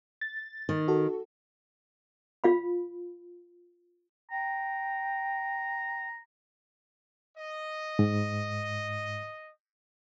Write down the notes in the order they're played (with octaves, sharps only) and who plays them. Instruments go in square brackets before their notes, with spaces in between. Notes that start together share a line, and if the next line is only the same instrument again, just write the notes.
[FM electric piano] A6
[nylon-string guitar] D#3
[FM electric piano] F#4 A4
[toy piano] F4 F5 B5
[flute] G5 [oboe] A#5
[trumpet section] D#5
[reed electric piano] G#2